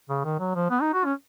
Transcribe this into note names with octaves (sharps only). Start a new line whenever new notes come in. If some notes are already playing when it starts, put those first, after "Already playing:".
C#3
D#3
F#3
F3
B3
D#4
F#4
C#4